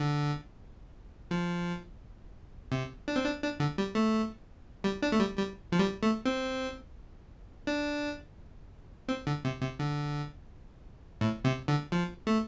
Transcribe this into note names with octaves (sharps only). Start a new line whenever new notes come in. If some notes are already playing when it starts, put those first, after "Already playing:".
Already playing: D3
F3
C3
D4
C4
D4
D4
D3
G3
A3
G3
D4
A3
G3
G3
F3
G3
A3
C4
D4
C4
D3
C3
C3
D3
A2
C3
D3
F3
A3